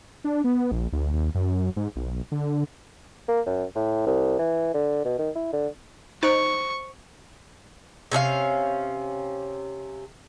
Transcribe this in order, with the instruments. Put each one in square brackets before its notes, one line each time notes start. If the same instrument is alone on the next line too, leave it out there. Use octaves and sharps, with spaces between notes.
[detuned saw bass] D4
B3
A#1
D2
D#2
F#2
G#2
B1
D3
[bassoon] A#3
F#2
A2
C2
E3
D3
B2
D#3
E4
D3
[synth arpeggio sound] D#4 F#6 D7 [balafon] C5 [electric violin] C#6
[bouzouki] C3 C#4 G#4 F5